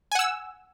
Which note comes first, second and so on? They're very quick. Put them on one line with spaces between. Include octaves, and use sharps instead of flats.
G#5 F#5 E6